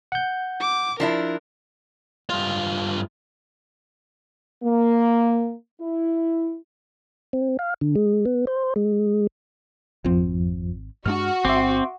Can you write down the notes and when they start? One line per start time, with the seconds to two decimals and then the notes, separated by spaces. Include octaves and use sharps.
0.12 F#5 G6
0.60 D6
1.00 F3 D4 E4 A#4
2.30 G2 F4
4.63 A#3
5.81 E4
7.33 C4
7.59 F5
7.81 D3
7.95 G#3
8.25 B3
8.47 C5
8.76 G#3
10.05 G#1 F2 F3 C4
11.06 G2 G#3 D4 F#4 F6
11.45 G1 C4 E5 C6 D6